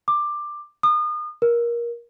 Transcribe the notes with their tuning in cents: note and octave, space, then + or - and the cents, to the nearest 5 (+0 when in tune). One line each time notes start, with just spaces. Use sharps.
D6 +15
D#6 -35
A#4 +20